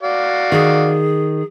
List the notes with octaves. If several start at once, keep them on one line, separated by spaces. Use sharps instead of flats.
F#4 D5 F5
D#3 G#4